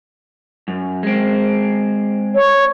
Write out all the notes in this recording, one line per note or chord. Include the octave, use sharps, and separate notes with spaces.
F#2
G#3 C4
C#5